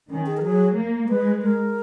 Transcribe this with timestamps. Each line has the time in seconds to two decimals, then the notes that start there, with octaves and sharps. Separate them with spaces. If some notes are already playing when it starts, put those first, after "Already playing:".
0.10 D#3 C#4
0.26 G#4
0.37 A#4
0.42 F#3 G#4
0.76 A#3
1.09 G#3 B4
1.42 A#4